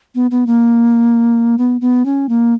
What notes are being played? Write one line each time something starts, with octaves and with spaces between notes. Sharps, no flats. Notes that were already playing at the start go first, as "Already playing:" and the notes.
B3
B3
A#3
B3
B3
C#4
A#3